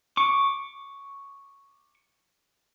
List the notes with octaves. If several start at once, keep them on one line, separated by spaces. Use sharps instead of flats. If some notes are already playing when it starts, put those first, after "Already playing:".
C#6 D6